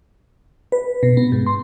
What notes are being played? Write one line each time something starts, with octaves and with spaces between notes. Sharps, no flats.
B4
B2
B3
G#2
C6